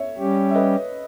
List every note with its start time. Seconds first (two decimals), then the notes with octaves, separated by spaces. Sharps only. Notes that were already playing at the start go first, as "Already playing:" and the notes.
Already playing: C#5 E5
0.18 G3 C#4 G4
0.50 E5
0.54 B4 D#5